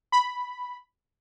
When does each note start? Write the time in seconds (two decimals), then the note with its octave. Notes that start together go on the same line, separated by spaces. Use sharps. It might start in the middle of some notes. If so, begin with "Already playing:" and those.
0.12 B5